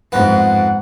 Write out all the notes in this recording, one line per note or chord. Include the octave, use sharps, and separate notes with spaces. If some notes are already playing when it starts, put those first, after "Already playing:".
F2 G#2 B3 F#5